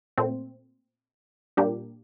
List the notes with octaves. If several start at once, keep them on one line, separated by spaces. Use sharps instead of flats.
A#2 A3 C4
A#2 G3 A#3 D4 G4